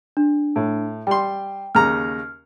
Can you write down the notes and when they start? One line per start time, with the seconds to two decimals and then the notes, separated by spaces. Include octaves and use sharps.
0.17 D4
0.56 A2
1.07 G3 G5 C6
1.75 D#2 C#3 A#5 F6